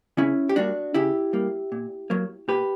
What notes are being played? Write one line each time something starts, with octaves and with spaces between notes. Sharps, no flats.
C#3 C#4 E4
G4
G3 A#3 D4 F#4
C#3 E4 G4
G3 A#3
A#2
F#3 A#3
A#2 G4 B4